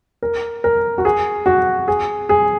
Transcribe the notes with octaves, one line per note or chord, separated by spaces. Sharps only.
A#4
A#4
F#4
G#4
F#4
G#4
G#4